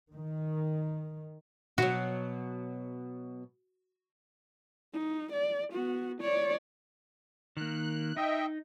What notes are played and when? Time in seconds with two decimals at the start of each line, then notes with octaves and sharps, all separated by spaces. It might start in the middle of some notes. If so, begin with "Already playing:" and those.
0.13 D#3
1.78 B2 F#3 F#4
4.94 D#4
5.32 D5
5.72 B3 F#4
6.21 C#5 D5
7.57 D#3 A#3 F#6
8.17 D#4 D#5 E5 G5